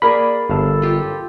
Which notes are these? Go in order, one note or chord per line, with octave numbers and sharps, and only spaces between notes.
A#3 G#4 A#4 D5 B5
G1 A4 F5 A5
F4 G4